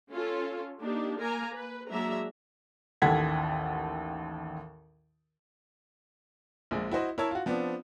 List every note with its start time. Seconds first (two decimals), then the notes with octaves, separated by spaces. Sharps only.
0.12 C#4 F4 A4
0.82 A#3 D4 D#4 G4
1.19 A#3 A#4 G#5 A#5
1.53 B4
1.90 F#3 G#3 A#3 D4 E5 A#5
3.02 A1 D#2 A4 F#5 G#6 B6
6.71 A#1 F3 G#3
6.91 E4 F#4 C5 D#5
7.18 E4 A#4 C#5 A5 E6
7.31 F4 F#4
7.46 F3 B3 C4 D4